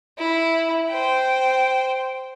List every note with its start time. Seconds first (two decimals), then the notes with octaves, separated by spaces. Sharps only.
0.18 E4
0.89 C5 G5